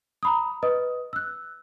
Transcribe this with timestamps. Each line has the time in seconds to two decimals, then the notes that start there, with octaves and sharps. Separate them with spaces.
0.23 A#5 B5 D#6
0.63 B4 D#5 D#6
1.13 E6 F#6